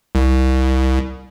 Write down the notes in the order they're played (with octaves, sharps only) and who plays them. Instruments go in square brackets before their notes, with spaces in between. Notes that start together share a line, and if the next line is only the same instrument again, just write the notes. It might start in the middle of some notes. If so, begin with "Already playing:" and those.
[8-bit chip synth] C2